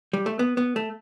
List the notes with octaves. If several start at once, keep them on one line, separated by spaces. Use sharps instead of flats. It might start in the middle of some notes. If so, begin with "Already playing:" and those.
G3
A3
B3
B3
A3